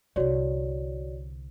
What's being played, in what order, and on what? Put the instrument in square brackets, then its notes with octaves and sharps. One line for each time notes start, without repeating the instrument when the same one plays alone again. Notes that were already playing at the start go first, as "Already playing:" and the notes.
[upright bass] C2 D3 [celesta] F#4 C#5 D5